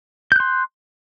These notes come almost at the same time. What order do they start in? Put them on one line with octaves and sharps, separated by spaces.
G6 F#6 C6